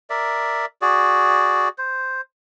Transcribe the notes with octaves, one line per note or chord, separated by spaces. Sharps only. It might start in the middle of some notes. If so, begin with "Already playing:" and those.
A#4 D5 E5
F#4 G#4 D5
C5